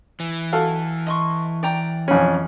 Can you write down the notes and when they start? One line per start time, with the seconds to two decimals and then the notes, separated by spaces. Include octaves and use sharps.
0.20 E3
0.53 F#4 A4 F5
1.06 D#5 C6 C#6
1.63 D5 G5 A#5
2.08 F2 C#4 G#4